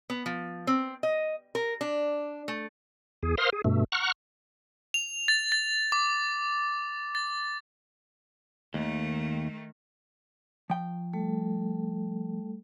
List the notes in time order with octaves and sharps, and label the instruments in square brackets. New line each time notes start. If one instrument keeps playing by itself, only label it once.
[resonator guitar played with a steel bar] B3
F3
C4
D#5
A#4
D4
A3
[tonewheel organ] E2 G#4
A#4 C5 F5 C6 D#6 F6
G#4
G2 B2 A3
F#5 A#5 C#6 F6 F#6
[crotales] F7
A6
A6
D6
A6
[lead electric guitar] D#2 [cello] D#3 A3
[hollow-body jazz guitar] F3 G5
[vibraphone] G3 A3 A4